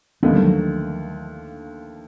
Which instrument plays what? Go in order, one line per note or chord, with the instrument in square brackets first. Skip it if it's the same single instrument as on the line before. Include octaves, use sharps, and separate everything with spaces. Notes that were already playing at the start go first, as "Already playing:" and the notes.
[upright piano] D#2 D3 F3 A3 [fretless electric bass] B3
[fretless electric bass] G3
F#3